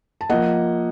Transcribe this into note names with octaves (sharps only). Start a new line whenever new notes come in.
A5
F3 A#3 D#5 F#5